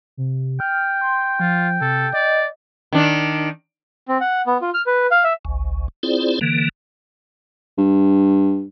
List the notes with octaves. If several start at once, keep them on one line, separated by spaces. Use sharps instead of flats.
C3
G5 F6
C6
F3 F4
C3 A4
D5 D#5
D#3 D4
C4
F#5
B3
F4
F6
B4
F5
E5
G#1 C#2
C4 E4 F4 G#4 C5 D5
D3 E3 A#3
G2